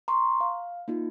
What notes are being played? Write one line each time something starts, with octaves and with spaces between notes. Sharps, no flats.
A#5 C6 C#6
F5
A#3 D#4 F4